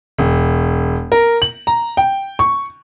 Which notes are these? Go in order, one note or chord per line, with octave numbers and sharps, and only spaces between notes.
E1
A#4
F#7
A#5
G5
C#6